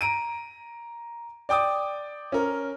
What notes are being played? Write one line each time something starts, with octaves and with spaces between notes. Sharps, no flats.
A#5 D7 D#7
D5 G5 D6 D#6
C#4 A#4